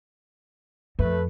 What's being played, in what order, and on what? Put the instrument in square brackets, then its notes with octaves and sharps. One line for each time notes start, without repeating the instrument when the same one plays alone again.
[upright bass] F2 [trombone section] A3 B4